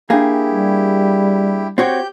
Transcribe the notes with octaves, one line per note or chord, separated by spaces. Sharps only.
A#3 D4 E4 G4 G#4 F5
G3
C4 F#4 G4 C#5 G6